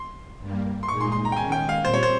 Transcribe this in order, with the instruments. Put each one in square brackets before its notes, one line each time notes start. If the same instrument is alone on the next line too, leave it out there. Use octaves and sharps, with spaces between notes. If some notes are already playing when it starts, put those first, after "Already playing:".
Already playing: [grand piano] C6
[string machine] G2 G3 A#3
[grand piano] C6
[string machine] A#2 G#3 D#4 G#4 [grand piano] C#6
[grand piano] C6
C6
A#5
G5
[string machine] D#3 G#3 C#4 [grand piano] G#5
[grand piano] G5
F5
[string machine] A#2 G3 C4 [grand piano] C5
[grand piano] C#5
C5